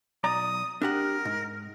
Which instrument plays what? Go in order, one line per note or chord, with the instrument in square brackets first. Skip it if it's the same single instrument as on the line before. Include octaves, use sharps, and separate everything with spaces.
[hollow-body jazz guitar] B1 D5 A#5 [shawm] D#6
[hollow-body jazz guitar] D4 G4 F#5 [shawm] A#4
[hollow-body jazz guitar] G#2